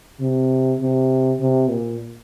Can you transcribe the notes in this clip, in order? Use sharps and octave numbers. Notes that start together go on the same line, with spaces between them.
C3
C3
C3
A#2